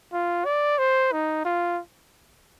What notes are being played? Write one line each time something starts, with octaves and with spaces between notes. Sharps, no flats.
F4
D5
C5
D#4
F4